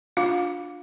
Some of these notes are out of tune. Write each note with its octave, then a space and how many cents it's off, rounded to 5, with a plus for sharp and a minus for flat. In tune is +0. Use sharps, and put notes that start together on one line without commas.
D4 +0 F4 +25 F5 +25